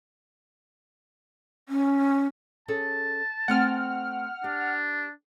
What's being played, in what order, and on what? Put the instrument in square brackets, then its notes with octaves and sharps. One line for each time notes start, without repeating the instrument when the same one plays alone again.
[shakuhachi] C#4
[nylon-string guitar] C#4 G#4 A4 [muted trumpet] A5
[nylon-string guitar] A3 C4 G#5 [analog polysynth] F#5 F6
[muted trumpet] D4 [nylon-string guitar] G4